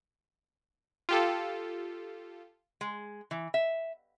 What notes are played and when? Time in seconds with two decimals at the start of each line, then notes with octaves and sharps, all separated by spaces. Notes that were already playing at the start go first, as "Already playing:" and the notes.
1.09 F4 G4 A4
2.81 G#3
3.31 E3
3.54 E5